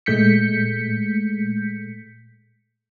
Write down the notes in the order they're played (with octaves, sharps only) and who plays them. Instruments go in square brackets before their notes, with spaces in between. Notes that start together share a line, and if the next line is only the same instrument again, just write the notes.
[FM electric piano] A#2 G#3 A3 G6 B6 C#7